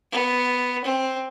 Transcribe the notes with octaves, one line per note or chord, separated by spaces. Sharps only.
B3
C4